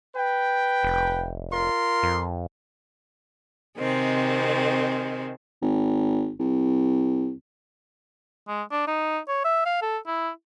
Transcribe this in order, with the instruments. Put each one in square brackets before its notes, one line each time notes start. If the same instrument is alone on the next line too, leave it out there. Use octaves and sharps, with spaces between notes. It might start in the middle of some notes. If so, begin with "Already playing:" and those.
[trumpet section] B4 G5
[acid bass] F1
[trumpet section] F4 A#4 C6
[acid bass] F2
[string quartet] C3 D#3 G#3 C4
[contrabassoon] G#1
C2
[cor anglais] G#3
D4
D#4
C#5
E5
F5
A4
E4